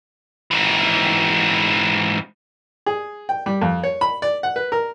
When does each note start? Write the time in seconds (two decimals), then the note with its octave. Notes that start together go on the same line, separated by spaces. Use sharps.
0.51 G#2 E3
2.86 G#4
3.29 G5
3.46 G3
3.61 F2
3.83 C#5
4.01 B5
4.22 D5
4.43 F#5
4.56 B4
4.72 A#4